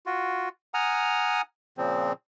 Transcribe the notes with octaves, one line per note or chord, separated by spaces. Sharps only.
F4 F#4
F#5 G#5 A#5 D#6 F6
A#2 C#3 F3 C4